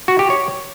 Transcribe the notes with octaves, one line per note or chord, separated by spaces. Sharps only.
F#4
G4
C#5